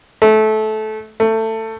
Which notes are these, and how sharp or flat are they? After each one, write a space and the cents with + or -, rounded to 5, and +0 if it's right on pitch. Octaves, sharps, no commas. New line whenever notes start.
A3 -20
A3 +20